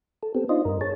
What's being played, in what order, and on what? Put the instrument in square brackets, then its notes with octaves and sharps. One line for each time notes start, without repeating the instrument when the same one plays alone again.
[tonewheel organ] A4
B3 C4 G4 A4
D4 D#4 F4 C5 D#5
G2 A#4
G#4 C#5 A5